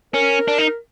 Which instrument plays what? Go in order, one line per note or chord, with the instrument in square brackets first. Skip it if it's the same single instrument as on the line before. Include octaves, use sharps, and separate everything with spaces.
[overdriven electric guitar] C#4 [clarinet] A#4
[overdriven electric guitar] D4
D#4